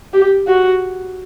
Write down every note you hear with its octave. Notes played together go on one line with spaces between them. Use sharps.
G4
F#4